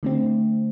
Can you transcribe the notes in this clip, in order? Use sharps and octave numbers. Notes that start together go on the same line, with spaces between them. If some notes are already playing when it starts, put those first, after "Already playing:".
D3 A3 C4